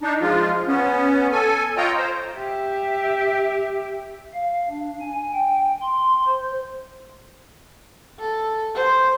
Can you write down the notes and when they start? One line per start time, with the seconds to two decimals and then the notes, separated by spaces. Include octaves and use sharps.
0.01 D4 D#4
0.21 F3 G#3 F4
0.68 B3 C#4
1.32 A4 G#5
1.77 F4 C#5 D#5 G5 A#5
1.97 C5
2.35 G4 E5
4.34 F5
4.70 D4
5.01 G#5
5.33 G5
5.81 C6
6.27 C5
8.20 A4
8.75 C5